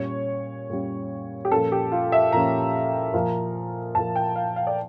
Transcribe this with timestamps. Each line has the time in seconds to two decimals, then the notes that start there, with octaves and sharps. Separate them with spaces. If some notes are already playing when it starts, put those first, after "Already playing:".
Already playing: A#2 G3 C#4 C#5
0.70 A#2 G3 C#4
1.45 G4
1.51 A#2 F3 A#3 C#4 A4
1.72 G4
1.92 F4
2.12 E5
2.32 A#2 F3 A#3 C#4 A#5
3.14 A#2 F3 A#3
3.95 A#2 F3 A#3 A5
4.16 G5
4.36 F5
4.56 F5
4.67 D5